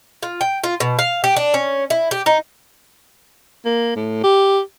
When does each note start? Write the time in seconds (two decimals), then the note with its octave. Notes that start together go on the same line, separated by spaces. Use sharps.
0.23 F4
0.41 G5
0.64 F4
0.80 B2
0.99 F5
1.24 G4
1.36 D4
1.54 C#4
1.90 E4
2.11 G4
2.26 D#4
3.65 A#3
3.96 A2
4.24 G4